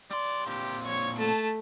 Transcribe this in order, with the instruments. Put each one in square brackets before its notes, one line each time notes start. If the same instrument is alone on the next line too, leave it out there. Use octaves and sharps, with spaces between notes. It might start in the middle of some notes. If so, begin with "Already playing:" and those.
[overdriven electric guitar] G3 C6 [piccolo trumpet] D5
[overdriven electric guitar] A#2 C4 [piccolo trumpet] G4
[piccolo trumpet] C#5 [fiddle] C#6
[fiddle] A3 [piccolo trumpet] A5